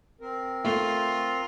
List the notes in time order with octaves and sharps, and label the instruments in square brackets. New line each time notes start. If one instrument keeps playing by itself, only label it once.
[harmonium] C4 A#4
[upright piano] A3 [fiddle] F4